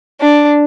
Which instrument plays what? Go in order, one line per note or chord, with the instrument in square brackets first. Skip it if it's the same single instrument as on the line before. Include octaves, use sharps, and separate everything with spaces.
[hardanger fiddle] D4